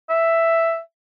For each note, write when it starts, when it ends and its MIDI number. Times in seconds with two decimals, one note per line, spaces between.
0.09 0.79 76